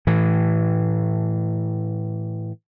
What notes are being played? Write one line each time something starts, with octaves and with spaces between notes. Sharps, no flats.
A2 E3